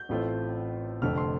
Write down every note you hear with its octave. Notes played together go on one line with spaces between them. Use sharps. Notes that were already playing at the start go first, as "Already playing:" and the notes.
Already playing: G6
A1 A2 A3 C4 F4
F1 F2 D3 A3 C4 F6
C6